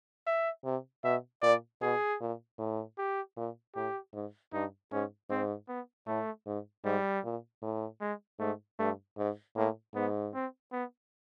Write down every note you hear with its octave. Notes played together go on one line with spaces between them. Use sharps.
E5
C3
B2 E5
A#2 D5
B2 G#4
A#2
A2
G4
A#2
A2 G4
G#2
G2 D#4
G#2 C#4
G#2 C4
B3
A2 A3
G#2
G#2 G3
A#2
A2
G#3
G#2 A3
G2 A3
G#2
A2 A#3
G#2 B3
C4
B3